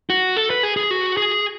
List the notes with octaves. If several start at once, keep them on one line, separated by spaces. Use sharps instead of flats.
F#4
A4
B4
G#4
G#4
F#4
G#4